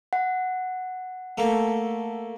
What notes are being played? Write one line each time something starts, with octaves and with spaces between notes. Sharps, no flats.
F#5
A3 A#3